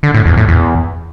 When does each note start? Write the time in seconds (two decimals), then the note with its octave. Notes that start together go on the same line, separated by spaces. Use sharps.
0.03 D3
0.14 A2
0.26 E2
0.37 A2
0.48 E2